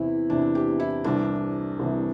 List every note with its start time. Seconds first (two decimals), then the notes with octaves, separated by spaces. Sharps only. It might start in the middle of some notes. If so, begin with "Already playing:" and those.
Already playing: E2 C3 E3 E4
0.30 E2 C3 E3 D4
0.55 G4
0.80 E4
1.04 C2 C3 E3 D4
1.80 C2 C3 E3